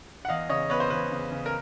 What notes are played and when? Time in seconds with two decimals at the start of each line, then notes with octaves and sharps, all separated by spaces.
0.25 F#5
0.29 E2 D#5 F5
0.49 C#3 C#5 D#5
0.70 B3 B4 C#5
0.80 C5
0.90 E2 B4
1.12 C#3
1.32 C#3
1.46 A#4